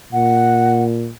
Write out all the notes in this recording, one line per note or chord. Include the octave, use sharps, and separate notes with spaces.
A#2 F#5